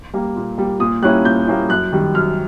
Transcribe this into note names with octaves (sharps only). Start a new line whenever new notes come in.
G3 A#3
A#2
G3 A#3
A#2 D#6
G3 A#3 C#4 E4 F#6
A#2 G6
G3 A#3 C#4 E4
F#2 F#6
D#3 G3
F#2 F6